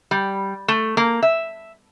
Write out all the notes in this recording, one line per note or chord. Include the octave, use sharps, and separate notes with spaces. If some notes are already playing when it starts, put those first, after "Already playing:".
G3
A3
A#3
E5